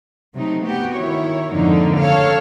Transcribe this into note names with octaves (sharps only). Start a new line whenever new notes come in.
C3 F#3 A3 D#4
B3 F#4 G4
D#3 E4 C#5
F2 G#2 D3 A#3 D#4
C#3 A4 C#5 F5